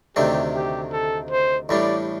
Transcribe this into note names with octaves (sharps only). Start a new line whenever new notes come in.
D2 C3 D#3 A3 D4 G4
G4
A4
C5
A1 A2 G3 D4 D5